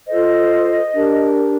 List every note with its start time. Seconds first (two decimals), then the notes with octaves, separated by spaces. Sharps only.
0.07 F4 A4 C5 D#5
0.93 D4 G4 A#4